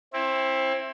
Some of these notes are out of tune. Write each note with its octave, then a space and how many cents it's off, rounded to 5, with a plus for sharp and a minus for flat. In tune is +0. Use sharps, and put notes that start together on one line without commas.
C4 +25 E4 +0